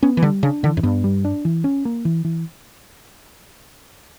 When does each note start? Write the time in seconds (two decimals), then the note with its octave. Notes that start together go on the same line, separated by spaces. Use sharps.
0.03 B3 C#4
0.17 E3
0.22 D3 G3
0.43 C#3 D4
0.63 D3 E3
0.77 F#2
0.83 G2 B3
1.04 G3
1.25 D4
1.45 E3
1.64 C#4
1.85 A#3
2.05 E3
2.25 E3